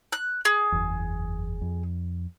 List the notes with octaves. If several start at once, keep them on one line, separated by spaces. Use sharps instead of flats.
F#6
G#4
F#1 E2
F2